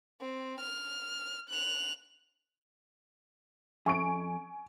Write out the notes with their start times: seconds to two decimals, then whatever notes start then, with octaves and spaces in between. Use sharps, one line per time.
0.21 C4
0.60 F6
1.49 F#6 F7
3.86 F2 G#5 C#6 D7